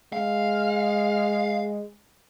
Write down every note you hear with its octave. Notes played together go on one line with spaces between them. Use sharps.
G#3 F5